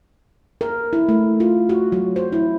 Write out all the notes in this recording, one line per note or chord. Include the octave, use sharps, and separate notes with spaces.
A#4
E4
A3
F4
F#4
F#3
C5
E4